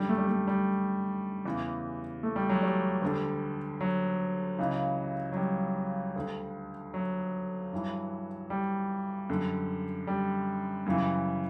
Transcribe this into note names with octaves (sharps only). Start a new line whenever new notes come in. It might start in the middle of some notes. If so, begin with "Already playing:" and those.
Already playing: F#2 D3 G3
A3
G3
A3
G3
E2 C#3 E3
A3
G3
F#3
G3
D2 D3
F#3
C#2 C#3 E3
F#3
G3
D2 D3
F#3
G2 E3
G3
F#2 D3
G3
F#2 C#3 E3